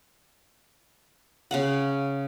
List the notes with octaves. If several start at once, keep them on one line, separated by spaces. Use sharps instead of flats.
C#3 F5 F#5